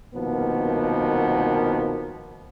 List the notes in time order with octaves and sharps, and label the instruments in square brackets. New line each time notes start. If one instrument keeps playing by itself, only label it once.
[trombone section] C2 B2 D#3 F3 A#3 B3